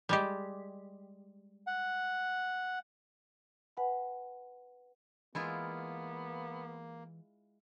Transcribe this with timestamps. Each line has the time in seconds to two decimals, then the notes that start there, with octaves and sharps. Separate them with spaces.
0.09 G3 G#3 G4
1.67 F#5
3.77 B4 F#5 G#5 B5
5.35 E3 G#3 A#3 B3 E4 F4